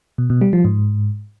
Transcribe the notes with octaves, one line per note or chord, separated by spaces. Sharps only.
B2
B2
G3
F3
G#2